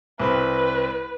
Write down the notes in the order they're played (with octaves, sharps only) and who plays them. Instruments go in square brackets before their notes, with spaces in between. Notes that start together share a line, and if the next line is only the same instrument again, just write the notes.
[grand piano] C2 C4 B5 [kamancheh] B4